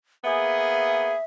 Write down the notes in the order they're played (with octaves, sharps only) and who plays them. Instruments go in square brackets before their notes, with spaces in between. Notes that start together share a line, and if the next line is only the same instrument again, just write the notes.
[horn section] A#3 B3 G#4 [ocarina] E5